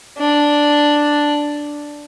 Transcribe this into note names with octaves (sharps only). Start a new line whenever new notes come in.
D4